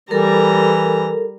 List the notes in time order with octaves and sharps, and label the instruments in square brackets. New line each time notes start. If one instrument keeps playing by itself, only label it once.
[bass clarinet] E3 [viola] G3 A#5 [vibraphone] A4 A#4